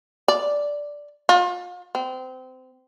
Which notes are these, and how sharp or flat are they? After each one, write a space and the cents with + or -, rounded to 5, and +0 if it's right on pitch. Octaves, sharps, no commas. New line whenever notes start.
D5 -5
F4 +35
C4 -25